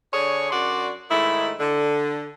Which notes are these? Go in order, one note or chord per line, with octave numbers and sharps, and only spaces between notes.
D3 D4 G#4 C#5
F#2 D4 F#4 D5 C6
G#2 D#3 A3 E4
D3